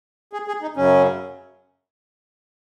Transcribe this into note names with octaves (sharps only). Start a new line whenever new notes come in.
G#4
G#4
D#4
F#2 C#3 F#3 C#4